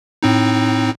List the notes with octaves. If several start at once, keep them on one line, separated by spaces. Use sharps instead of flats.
A2 C4 D#4